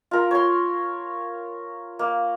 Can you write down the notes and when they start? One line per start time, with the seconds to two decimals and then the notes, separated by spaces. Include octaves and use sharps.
0.11 F4 A#4
0.31 C#5 C6
1.99 A#3